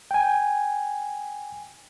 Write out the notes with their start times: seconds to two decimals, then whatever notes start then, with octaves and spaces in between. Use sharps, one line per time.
0.11 G5 G#5